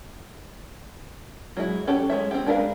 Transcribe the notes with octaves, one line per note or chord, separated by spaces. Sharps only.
F#3 G#3 E4
C#4 F#4 G4 A4 C#5
G#3 C#5 E5
C4 G4
G#3 D4 A#4 B4 F5